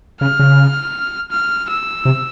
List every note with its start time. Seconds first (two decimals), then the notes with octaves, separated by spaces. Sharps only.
0.21 C#3 F6
0.39 C#3
1.32 F6
1.69 E6
2.05 C3